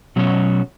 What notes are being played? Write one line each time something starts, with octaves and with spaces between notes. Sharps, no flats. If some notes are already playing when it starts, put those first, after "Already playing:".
B2 F#3 C#4 F#4